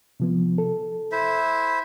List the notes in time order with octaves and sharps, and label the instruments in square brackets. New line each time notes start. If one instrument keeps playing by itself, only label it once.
[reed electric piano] C3 F3 B3
A4
[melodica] E4 C5 E5